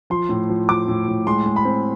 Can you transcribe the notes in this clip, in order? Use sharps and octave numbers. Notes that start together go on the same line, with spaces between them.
F3 C6
A2
F3
F3 D6
A2
A2
G#3 C6
G#3
B5
C4